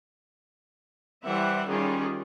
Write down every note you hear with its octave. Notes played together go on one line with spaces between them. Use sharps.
E3 G3 C5 E5 F#5
D#3 G3 C#4 F4 G#4